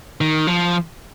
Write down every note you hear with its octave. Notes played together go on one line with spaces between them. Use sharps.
D#3
F3